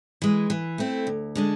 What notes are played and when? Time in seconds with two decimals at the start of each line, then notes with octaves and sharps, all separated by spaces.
0.22 E3 G#3
0.50 E3
0.78 A3 C4 E4
1.07 D2
1.35 D3 G#3 D4